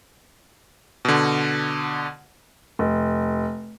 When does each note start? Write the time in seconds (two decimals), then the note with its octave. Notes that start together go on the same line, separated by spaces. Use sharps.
1.05 B2 D3
2.79 F1